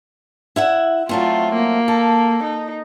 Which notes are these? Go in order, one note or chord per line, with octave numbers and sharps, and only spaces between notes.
E4 E5 F#5
F#3 A3 C4 F4
A#3
A4
D#4